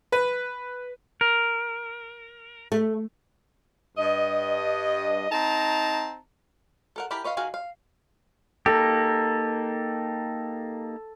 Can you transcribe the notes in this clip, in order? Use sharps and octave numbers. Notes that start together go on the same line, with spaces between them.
B4
A#4
A3
G2 D#5
C4 D#4 A5 A#5
A4 A#4 F#5
E4 G4 A#4 A5 B5
B4 C#5 D#5 F5
D#3 F#4 G#4 F5 G#5
F5
A#3 D#4 G4 A4